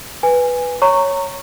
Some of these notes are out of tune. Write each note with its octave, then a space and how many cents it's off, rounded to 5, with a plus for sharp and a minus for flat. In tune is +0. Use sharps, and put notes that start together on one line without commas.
B4 +0 G#5 -15
C#5 +0 A#5 -20 C#6 +0